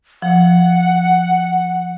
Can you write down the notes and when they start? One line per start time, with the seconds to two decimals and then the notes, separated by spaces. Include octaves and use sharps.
0.22 F3 F#5